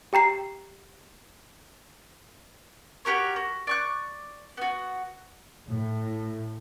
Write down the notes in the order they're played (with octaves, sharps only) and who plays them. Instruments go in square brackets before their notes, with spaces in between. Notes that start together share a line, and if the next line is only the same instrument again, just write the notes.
[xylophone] G4 G5 A#5 C7
[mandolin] F#4 G4 A#4 C#5
F#4
D5 C#6 F#6
B3 F#4
[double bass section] A2